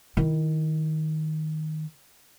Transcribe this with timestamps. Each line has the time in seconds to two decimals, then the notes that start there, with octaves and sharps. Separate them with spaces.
0.17 D#3 E4